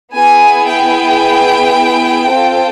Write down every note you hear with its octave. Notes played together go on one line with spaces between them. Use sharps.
B3 E4 G#4 G#5
G5
C4 F4 A4